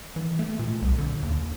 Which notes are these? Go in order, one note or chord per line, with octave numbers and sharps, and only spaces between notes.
E3
A3
A#2
C2
D3
D#2